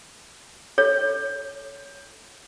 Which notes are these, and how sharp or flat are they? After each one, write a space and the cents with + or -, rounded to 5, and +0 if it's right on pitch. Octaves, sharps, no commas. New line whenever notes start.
A4 +0 C#5 +15